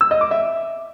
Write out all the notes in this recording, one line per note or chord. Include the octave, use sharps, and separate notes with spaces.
E6
D#5
D6
E5